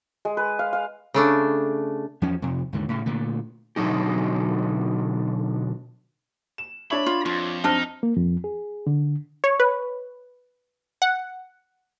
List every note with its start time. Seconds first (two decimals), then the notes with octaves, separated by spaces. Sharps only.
0.25 G#3
0.37 B4
0.59 F5
0.73 F5
1.14 C#3 A3 D4
2.22 E2 F3 C#4
2.42 F2 C3
2.73 D#2 G#2 D3
2.89 A2 C#3
3.06 A#2 D3 A3
3.76 B2 D3 F#3 D#4 G4
6.58 E7
6.91 D4 C#5 E5 B5
7.06 F4
7.26 F2 F4
7.64 F2 C4 D4 D#4 F6
8.03 A#3
8.17 F2
8.44 G#4
8.87 D3
9.44 C#5
9.60 B4
11.02 F#5